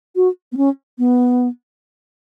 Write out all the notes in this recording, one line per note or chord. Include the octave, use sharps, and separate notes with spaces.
F#4
B3
C#4
B3